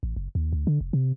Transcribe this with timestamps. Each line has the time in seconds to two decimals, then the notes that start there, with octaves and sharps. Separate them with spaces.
0.03 A1
0.16 F#1
0.35 D#2
0.53 D2
0.67 D3
0.81 F1
0.93 C3